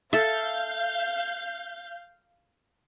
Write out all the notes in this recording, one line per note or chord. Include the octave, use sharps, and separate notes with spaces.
A4 E5 F5 G6